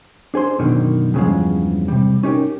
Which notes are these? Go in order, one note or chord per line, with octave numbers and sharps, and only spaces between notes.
D4 G#4 C5 C6
F#2 B2 D3 D#3
E2 G2 C#3 F3 G#3
C3 G3
C#4 D#4 G4 A#4